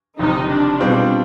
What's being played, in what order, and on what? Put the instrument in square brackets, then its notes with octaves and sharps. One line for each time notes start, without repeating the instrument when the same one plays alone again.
[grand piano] F#1 F2 C3 D#3 [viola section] D#4
[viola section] D4
[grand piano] B2 G3 C4 F4 G#4